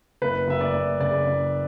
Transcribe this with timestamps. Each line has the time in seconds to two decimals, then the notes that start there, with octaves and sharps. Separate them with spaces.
0.22 F#1 B4
0.48 F#1 E5
0.61 D5
0.74 F#1
1.00 C#3 D5
1.26 F#1